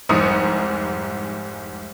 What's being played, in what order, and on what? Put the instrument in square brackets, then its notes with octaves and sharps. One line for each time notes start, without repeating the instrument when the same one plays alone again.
[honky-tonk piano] F1 C2 G#2 D#6 C#7